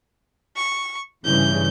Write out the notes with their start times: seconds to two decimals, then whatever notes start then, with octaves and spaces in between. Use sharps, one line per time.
0.56 C#6
1.24 G2 C#3 E3 G6